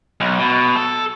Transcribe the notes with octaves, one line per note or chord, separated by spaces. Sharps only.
B1
B2
A4